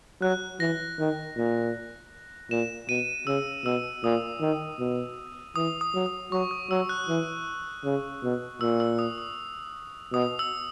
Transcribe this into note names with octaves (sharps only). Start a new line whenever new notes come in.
F#3 F#6
E3 A#6
D#3
A#2
A#2 E7
B2 D#7
C#3 E6
B2 E6
A#2 D#6
D#3
B2
E3 D#6
D#6
F#3
D#6
F#3 C#6
D#6
F#3 E6
F#6
E3
C#3
B2
A#2 E6
E6
D#6
D#6
B2 D#6
E6